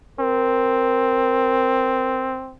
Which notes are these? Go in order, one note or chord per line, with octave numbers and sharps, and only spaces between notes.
C4 A#4